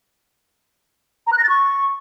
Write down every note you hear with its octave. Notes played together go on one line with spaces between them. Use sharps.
A#5
F#6
A#6
A6
C#6